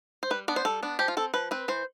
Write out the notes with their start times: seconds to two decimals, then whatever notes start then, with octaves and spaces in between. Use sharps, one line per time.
0.23 C5
0.30 G3 B4
0.48 B3 D4 D5
0.56 C5
0.65 G3 A4
0.83 B3 D4
0.99 F3 G4
1.08 F4
1.17 C4 A4
1.34 F3 B4
1.51 C4 B4
1.68 E3 C5